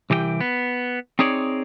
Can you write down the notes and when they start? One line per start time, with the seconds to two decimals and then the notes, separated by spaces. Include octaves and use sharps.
0.10 C2 E3 G4 D5 G5
0.41 B3
1.19 C4 D#4 G#4 C#5 D5